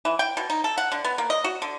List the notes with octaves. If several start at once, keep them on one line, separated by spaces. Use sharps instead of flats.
E3
G5
B2
D#4
A4
F#5
D3
B3
A#3
D#5
F#4
D3